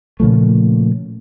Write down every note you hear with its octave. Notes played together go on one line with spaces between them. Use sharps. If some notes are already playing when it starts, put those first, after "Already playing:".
A#2 C#3 F3 A3